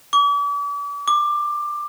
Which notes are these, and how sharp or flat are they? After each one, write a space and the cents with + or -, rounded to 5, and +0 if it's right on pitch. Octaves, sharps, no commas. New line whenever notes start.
D6 -40
D6 +15